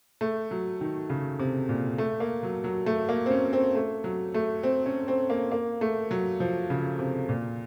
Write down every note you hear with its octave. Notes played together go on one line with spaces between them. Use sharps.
A3
F#3
D#3
C#3
C3
A#2
A3
A#3
F#3
F#3
A3
A#3
C4
C#4
C4
A3
F#3
A3
C4
C#4
C4
A#3
A#3
A3
F#3
F3
C#3
C3
A#2